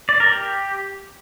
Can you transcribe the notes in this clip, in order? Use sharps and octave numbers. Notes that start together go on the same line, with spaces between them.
D5
A#4
G4